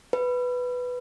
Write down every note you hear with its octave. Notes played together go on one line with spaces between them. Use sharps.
B4